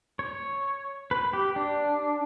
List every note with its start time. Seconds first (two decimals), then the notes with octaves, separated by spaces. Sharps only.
0.19 C#5
1.11 B4
1.33 G4
1.56 D4